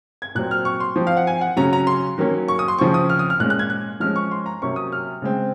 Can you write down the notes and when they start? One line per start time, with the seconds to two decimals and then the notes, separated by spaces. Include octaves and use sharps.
0.22 G#6
0.35 A#2 F#3 C4 F#6
0.51 F6
0.65 C#6
0.80 C6
0.96 F3 C4
1.07 F5
1.17 F#5
1.27 G#5
1.41 F#5
1.57 C#3 F#3 C#4 A#5
1.73 A#5
1.87 C6
2.18 D#3 F#3 A#3 C#4
2.48 C#6
2.59 D#6
2.68 C6
2.79 C#3 F3 C4 C#6
2.94 D#6
3.10 F6
3.19 D#6
3.30 F6
3.40 A#2 G#3 C#4 F#6
3.50 F#6
3.59 G#6
3.70 F#6
4.00 F3 G#3 C#4 F6
4.16 C#6
4.32 C6
4.46 A#5
4.62 C3 F#3 A#3 C#4 C#6
4.76 D#6
4.92 F6
5.22 C#3 G#3 C4